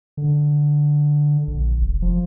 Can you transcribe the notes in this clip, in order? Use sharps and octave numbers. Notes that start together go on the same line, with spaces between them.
D3
A#1
F1
F3